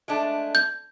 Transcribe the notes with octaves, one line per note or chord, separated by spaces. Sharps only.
G#3 A3 D4
G6